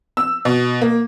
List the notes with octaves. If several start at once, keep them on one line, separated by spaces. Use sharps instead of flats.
E6
B2
A#3